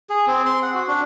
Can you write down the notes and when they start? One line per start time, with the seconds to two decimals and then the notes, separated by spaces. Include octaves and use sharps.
0.10 G#4
0.27 C4
0.45 C6
0.62 F#5
0.74 F#4
0.88 D4